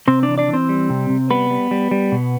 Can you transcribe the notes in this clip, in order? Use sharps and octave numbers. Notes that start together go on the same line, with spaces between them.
C3 C4 C5
D4 D5
E3
D4 D5
E3
C4 C5
G3
C3
C3
G3 B3 B4
G3
G3
G3
B2